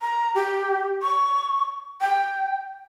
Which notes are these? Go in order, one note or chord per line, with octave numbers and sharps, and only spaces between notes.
A#5
G4
C#6
G5